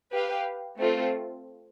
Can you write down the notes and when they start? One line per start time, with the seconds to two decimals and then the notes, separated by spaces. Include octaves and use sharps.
0.12 G4 B4 F5
0.79 A3 C4 F4